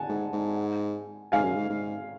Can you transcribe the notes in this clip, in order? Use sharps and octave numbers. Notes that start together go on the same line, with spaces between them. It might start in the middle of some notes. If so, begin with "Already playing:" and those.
Already playing: F#5 G#5 A5
G#2
G#2
G#2 F5 G#5
F#2
G#2
G#2